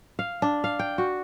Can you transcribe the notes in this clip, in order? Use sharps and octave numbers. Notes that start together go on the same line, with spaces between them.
F5
D4
F5
G5
F#4